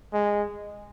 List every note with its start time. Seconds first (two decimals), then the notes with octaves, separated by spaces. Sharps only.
0.13 G#3